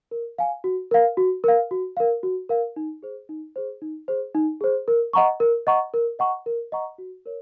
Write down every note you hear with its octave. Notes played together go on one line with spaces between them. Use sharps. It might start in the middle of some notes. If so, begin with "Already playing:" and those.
A#4
F5 G#5
F#4
A#4 F5
F#4
A#4 F5
F#4
A#4 F5
F#4
A#4 F5
D#4
G#4 C5
D#4
G#4 C5
D#4
G#4 C5
D#4
G#4 C5
A#4
D#5 F#5 A#5 C#6
A#4
D#5 F#5 A#5 C#6
A#4
D#5 F#5 A#5 C#6
A#4
D#5 F#5 A#5 C#6
F#4
A#4 C#5